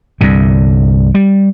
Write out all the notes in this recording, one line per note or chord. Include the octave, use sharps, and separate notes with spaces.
C2 G2 D3
G3